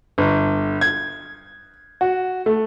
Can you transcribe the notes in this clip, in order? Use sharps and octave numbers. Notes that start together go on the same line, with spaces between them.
G1
G#6
F#4
A3